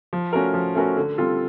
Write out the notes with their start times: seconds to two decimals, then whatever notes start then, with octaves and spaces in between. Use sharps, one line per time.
0.13 F3
0.33 A3 C#4 F#4 A#4
0.54 F3
0.75 A3 C#4 F#4 A#4
0.97 D3
1.18 G3 C4 F4 A4